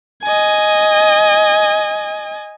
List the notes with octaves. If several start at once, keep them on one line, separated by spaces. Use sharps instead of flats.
D#5 G#5